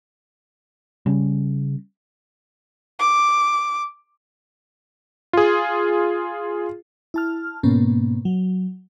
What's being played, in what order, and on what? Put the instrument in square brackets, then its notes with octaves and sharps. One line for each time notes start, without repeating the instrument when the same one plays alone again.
[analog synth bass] C#3 [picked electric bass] G3 C#4
[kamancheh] D6
[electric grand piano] F4 G#4
[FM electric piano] E4 A5 F6
G#2 B2 A#3 B3 C#4
F#3